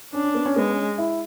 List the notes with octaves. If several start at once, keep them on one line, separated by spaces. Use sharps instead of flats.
C#4 D4
C#4
B3
C#4
G#3 B3
C#4
E4